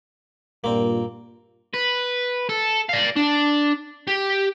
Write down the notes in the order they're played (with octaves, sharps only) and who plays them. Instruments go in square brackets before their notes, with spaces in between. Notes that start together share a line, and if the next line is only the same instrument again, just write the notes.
[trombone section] G2 A#2 [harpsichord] A#3 C4
[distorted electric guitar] B4
A4
D5 F5
D4
G4